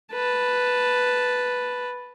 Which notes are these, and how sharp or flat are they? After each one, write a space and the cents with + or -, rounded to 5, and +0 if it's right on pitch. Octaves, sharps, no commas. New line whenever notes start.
B4 +0 A5 +0